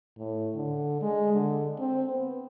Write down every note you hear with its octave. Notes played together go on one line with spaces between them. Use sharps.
A2
D3
G#3
D3
C4
B3